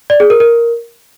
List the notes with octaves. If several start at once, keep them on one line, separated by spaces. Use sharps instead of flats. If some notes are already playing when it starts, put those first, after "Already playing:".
D5
G#4
A#4
A#4